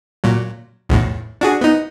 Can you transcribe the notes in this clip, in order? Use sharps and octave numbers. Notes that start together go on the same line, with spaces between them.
A#2 F#3
B1 E2 A2
D4 F#4 G#4
B3 D#4